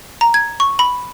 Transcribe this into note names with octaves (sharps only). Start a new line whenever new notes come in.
A#5
G#6
C#6
B5